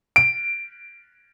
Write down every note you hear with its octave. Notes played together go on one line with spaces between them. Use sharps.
D7